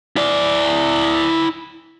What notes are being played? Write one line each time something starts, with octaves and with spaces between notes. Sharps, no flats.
E4 D5